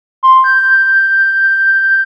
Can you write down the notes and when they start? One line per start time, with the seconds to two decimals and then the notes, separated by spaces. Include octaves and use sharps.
0.23 C6
0.44 G6